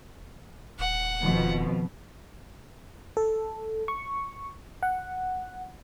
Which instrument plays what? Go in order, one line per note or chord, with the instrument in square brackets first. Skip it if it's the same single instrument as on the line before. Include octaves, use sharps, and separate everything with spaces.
[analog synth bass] D#1 [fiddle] F#5
[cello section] F2 B2 [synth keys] D#3 F3
[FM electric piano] A4
C#6
F#5